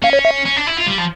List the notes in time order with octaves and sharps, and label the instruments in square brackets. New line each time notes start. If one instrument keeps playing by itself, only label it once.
[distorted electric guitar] C#4 [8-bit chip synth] F5
[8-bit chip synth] C#5
E5
[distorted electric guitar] C#4
D4
E4
F4
G3
F3